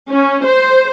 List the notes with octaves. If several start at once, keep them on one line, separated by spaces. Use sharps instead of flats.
C#4
C5